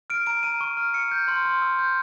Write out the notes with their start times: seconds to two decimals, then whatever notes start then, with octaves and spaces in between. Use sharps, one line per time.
0.10 F6 D7
0.27 A#5 D7
0.43 A#5 D#7
0.61 C#6
0.77 F6
0.94 E6 C#7
1.12 G6
1.28 C6
1.45 C6
1.62 E6
1.79 G6